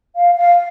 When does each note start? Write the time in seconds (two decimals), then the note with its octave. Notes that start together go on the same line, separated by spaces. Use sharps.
0.16 F5
0.38 F5